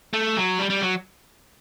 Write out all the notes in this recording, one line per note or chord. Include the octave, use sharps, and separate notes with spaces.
A3
F#3
G3
G3
F#3